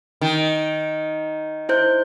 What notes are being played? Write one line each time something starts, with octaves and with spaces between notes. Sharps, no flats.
D#3
E4 C5 G6